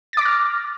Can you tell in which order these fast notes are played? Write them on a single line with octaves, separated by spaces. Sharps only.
A6 D6 A#6 F6